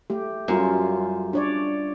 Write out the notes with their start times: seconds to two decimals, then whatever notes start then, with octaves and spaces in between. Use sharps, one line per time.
0.10 A3 G4
0.48 F#2 G3 C#4 F4
1.33 D4 C#5 D5